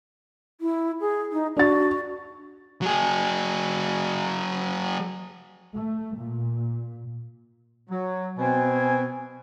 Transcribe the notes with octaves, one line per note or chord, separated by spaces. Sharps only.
E4
G#4
D#4
D4 F#4 A6
F#3 G#4
A3
A#2
F#3
B2 C4 G#5